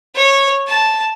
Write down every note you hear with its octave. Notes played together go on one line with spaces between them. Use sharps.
C#5
A5